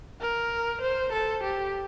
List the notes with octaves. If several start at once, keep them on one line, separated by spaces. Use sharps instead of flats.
A#4
C5
A4
G4